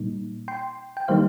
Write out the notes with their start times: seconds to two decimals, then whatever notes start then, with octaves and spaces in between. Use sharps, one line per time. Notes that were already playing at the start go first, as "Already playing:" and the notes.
Already playing: A#2 G3 A#3 D#4
0.48 G5 C6
0.97 G5
1.08 D#3 G3 A#3 D#4 C5 F5